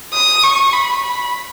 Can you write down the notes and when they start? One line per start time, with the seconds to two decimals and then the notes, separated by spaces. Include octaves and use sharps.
0.14 D#6
0.43 C#6
0.73 B5
1.03 B5